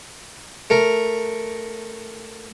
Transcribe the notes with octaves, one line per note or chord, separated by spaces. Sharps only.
A3 A#4